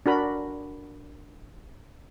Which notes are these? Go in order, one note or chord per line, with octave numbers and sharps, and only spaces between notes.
D4 F#4 A#4 B5